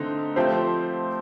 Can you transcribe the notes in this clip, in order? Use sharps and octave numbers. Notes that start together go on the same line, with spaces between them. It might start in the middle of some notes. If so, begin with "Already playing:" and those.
Already playing: D3 A3 C4 D#4
F3 A3 C4 G4 C5